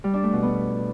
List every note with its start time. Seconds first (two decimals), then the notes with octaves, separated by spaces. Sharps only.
0.04 G3
0.14 D4
0.23 A3
0.33 B2
0.43 B3